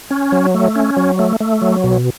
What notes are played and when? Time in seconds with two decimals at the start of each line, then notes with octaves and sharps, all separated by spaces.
0.10 C#4
0.32 F#3
0.54 A3
0.76 C#4
0.97 F#3
1.19 A3
1.40 A3
1.61 F#3
1.84 B2